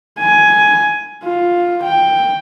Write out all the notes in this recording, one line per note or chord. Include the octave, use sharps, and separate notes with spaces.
G#5
F4
G5